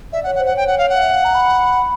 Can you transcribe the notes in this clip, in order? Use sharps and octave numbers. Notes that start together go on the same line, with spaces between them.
D5 E5
C#5 F#5
F#5
C5
F#5
C#5 G5
F#5
F5
F#5
F5
E5
F5
A#5
B5